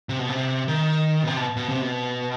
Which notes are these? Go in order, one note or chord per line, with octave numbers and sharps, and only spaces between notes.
C3
B2
C3
D#3
B2
C3
B2
B2
C3
B2